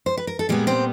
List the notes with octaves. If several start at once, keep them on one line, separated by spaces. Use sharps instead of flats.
C5
B4
A#4
A4
A#2 G3 G#3 B3 G#4
C4 C5